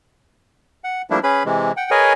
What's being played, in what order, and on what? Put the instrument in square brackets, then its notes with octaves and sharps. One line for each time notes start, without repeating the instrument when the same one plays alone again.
[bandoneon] F#5
F3 G3 A3 A#3 D4 E4
C#4 G#4 B4 B5
C3 E3 G#3
F#5 G5
G#4 A#4 B4 C#5 D#5 G#5